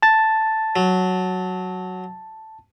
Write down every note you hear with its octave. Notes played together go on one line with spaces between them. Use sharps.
A5 A6
F#3